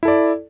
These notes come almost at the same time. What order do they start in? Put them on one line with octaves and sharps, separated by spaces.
E4 A4 D5